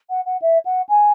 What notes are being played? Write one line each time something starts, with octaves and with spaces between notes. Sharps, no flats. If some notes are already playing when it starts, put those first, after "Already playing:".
F#5
F#5
E5
F#5
G#5